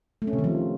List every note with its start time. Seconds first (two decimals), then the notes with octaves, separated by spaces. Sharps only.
0.22 A3
0.27 C#4
0.33 C3
0.38 D#3
0.44 F3